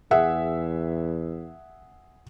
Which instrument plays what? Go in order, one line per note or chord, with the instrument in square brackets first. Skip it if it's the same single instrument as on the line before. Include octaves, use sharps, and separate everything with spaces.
[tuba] E2 [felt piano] G#4 E5 F#5